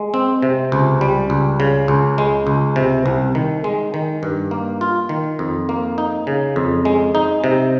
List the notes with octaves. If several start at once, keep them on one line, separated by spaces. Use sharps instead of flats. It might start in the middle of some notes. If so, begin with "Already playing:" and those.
Already playing: G#3
C4
C3
C#2
G3
C#2
C#3
C#2
G#3
C#2
C3
C2
D#3
G#3
D#3
G2
A#3
F4
D#3
F2
A#3
D#4
C#3
F2
G#3
D#4
C3